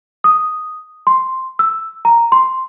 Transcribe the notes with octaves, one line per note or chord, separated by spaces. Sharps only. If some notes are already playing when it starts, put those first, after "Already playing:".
D#6
C6
E6
A#5
C6